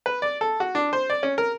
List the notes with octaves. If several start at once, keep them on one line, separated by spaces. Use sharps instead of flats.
B4
D5
A4
F#4
D4
C5
D5
C#4
A#4